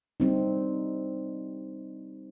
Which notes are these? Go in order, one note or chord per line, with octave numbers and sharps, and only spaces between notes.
G3 C4 D#4